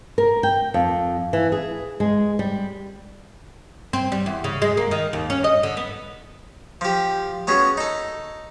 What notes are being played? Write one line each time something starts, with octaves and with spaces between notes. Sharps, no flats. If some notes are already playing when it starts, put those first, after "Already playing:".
A#4
G5
F2
E3
G#4
G#3
G3
C4
G3
E2
C#3
G#3
A#3
D#3
D#2
C#4
D#5
D3
B3
F3 G4
B3 C#4 F#4 G#4
D#4 A4